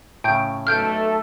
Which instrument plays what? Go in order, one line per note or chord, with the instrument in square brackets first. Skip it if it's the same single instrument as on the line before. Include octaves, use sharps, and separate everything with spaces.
[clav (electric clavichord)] A2 C#3 [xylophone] G5 G6 D7
[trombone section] B1 A3 [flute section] A4 [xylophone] F6 G6 D7